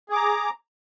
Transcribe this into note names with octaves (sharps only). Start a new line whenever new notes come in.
G#4 A#5 D6